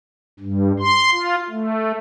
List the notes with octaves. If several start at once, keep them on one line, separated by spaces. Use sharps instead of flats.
G2
C6
F4
A3